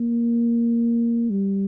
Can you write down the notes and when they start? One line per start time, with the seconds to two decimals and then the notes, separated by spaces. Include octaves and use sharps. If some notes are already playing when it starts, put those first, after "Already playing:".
Already playing: A#3
1.30 G3